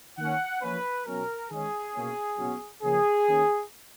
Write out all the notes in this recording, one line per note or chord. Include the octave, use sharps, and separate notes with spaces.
D#3 A#3 C#4 F#5
F3 A#3 C#4 B4
B2 F#3 C#4 A#4
D#3 G#3 C#4 G#4
B2 A#3 C#4
B2 F#3 C#4
C#3 F3 A#3 C#4 G#4
D#3 A#3 C#4